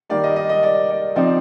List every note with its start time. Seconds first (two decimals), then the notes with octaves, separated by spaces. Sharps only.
0.10 D#3 G3 A#3 D5
0.24 D#5
0.36 D#5
0.49 D#5
0.63 D5
0.90 D5
1.16 F3 C4 D#4 D5